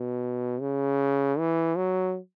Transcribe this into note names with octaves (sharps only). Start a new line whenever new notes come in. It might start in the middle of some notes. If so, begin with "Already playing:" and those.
Already playing: B2
C#3
E3
F#3